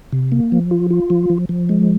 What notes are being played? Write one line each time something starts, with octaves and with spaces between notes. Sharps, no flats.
C3
A#3
F3
F4
F4
F3
F3
F3
G#3